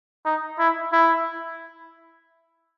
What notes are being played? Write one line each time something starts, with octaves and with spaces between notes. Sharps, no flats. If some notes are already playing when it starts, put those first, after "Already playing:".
D#4
E4
E4